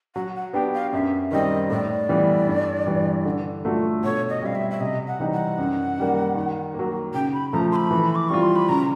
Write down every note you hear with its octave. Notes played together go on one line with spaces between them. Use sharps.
F#3 F#5
F#5
B3 D4 G4 G5
F5
F#2 E5
D#3 G3 C4 D#5
A2 D5
E3 G3 B3
G2
E3 G3
D3
F#3 A3 D4 F4
B2 C#5
D#5
G3 C4 F5
E5
E5
C3 D#5
F#5
E3 G3 C4 D#4
F#5
F#2
D#3 G3 A#3
D#3
F#3 A#3
C#3 G5
B5
F3 A3 A#5
C6
B5
E3
D6
G3 C4 F4 C#6
C6
B5
C#3 A#5